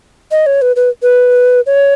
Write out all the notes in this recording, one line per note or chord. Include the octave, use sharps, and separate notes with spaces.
D#5
C#5
B4
B4
B4
C#5